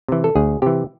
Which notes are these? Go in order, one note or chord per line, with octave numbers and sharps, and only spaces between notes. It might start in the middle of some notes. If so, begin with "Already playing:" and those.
C3 E3
A4
D2 G#4
C3 E3 G4